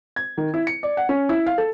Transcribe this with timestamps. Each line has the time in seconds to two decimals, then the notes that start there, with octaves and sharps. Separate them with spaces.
0.16 G#6
0.37 D#3
0.54 E4
0.67 C#7
0.83 D5
0.97 F#5
1.09 C#4
1.29 E4
1.46 F5
1.58 A4